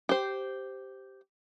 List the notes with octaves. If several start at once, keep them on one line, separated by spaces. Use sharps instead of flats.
G4 C5